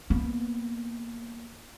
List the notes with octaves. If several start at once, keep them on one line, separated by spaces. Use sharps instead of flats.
A#3 B3